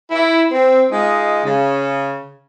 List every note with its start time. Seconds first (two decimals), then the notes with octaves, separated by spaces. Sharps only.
0.11 E4
0.52 C4
0.90 G#3 D#4 F4
1.44 C#3